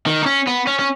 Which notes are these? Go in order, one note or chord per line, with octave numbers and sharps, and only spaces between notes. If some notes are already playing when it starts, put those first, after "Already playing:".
D#3
D#4
C#4
B3
C#4
C#4